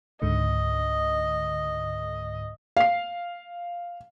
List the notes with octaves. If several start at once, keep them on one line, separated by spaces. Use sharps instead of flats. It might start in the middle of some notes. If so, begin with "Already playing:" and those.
C#2 G#2 D3 D#5
F5 C7